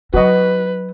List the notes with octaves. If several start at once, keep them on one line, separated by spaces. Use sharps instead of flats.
F#3 D#4 F#4 B4 D#5